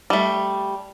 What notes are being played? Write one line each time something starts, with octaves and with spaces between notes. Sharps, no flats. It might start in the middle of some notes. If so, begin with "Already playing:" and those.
G3 A3